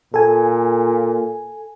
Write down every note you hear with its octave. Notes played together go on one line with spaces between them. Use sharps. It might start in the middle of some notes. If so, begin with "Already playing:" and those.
A#2 A4 G#5